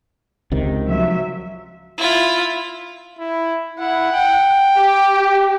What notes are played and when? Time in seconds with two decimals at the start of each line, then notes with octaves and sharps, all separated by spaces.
0.52 C#2 C3 D#3
0.85 F3 F#3 E5
1.98 E4 F4
3.19 E4
3.80 E4 F#5
4.13 G5
4.76 G4